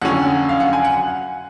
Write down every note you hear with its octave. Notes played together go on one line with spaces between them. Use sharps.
F2 D3 F#3 C#4 F#5
F5
F#5
G#5
F#5